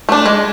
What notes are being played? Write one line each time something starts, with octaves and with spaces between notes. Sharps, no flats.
A3 D4
G#3